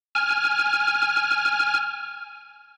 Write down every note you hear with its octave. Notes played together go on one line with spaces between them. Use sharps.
G#5 F6